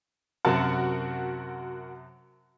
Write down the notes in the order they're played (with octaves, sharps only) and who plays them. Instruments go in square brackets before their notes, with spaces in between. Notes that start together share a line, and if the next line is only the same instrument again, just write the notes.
[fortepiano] F#2 C3 A5 [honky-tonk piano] F#4 A#4 F#5